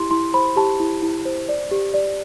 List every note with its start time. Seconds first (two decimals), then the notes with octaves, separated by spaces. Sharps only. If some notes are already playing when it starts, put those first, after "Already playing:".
Already playing: E4 G4 C6
0.11 E4 C6
0.34 C5 B5
0.57 G4 A5
0.80 E4
1.02 E4
1.25 C5
1.49 D5
1.71 G4
1.94 D5